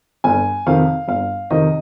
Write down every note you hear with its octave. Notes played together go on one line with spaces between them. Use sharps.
G1 G#5
F2 C3 D#3 F5
G1 F5
F2 C3 D#3 D#5